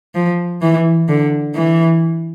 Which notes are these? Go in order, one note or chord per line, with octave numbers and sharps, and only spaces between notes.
F3
E3
D3
E3